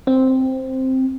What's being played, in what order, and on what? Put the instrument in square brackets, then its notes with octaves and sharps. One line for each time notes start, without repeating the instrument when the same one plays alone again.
[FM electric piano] C4